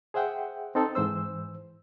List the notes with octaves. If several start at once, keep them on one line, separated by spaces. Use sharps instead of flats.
G#4 C5 E5 F#5 G5
C4 D#4 A4
G#2 E3 C5 E6